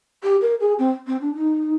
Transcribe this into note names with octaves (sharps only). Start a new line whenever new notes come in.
G4
A#4
G#4
C4
C4
D4
D#4